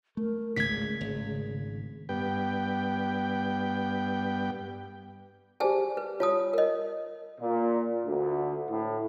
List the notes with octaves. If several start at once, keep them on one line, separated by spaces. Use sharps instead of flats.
A3 A#4
G#1 C#2 A#2 C#3 G#6 B6
G#1
G2 B3 G5
G4 G#4 C5 D5 G#5 A5
B4
F4 C#5 A5 D#6
A#4 D#5
A#2
D2
A2